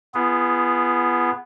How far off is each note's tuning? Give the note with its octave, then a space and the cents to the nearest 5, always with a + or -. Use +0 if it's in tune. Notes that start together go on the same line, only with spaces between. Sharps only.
B3 +0 F4 -40 G#4 +0